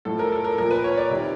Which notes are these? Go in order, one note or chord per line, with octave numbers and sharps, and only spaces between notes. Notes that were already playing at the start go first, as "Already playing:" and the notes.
A2 F3 A4
A#4
A4
A#4
A#2 F3 A#4
B4
C#5
D5
C3 D#3